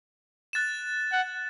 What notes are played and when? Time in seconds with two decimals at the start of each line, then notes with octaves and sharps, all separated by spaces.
0.53 F#6 A6 E7
1.12 F#5